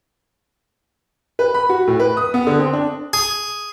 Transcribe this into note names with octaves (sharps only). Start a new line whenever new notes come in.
B4
B5
F#4
A2
B4
D#6
B3
D3
C4
D4
G#4